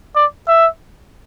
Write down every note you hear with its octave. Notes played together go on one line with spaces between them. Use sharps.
D5
E5